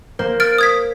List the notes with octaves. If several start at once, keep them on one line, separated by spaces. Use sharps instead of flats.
A#3 C5
F6 A6 D7
D#6 G#6 B6